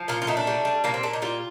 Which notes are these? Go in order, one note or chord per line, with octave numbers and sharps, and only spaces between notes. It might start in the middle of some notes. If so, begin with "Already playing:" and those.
Already playing: F3
A#2 F4
F4
A3 D#4
D4
G3
G3
A#2 A#3
C4
A#2 D4
D#4
G3 F4